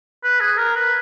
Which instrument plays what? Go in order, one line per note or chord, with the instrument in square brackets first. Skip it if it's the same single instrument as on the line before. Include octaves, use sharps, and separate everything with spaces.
[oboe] B4
G#4
A#4
B4